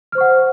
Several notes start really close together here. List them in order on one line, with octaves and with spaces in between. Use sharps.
F6 C5 C#6 F#5